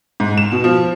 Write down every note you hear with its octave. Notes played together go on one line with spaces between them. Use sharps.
G#2
E7
B2
F3